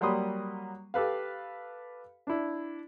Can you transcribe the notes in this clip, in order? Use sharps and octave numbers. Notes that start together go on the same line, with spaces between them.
F#3 G3 A#3 B5 C6 D#6
G4 A4 B4 F5
D4 E4